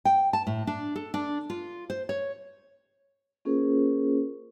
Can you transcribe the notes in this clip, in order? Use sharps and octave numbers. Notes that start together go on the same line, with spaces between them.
G5
A5
A2
D4
A4
D4
F4
C5
C#5
A#3 C#4 F4 G#4 A#4 C5